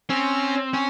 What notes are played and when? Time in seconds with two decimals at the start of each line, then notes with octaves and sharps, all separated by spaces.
0.09 C4 C#4
0.73 C#4